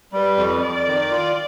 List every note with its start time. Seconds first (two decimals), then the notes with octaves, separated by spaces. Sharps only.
0.13 G3 B4
0.37 F2
0.62 F2 D5
0.87 D#3
1.11 F4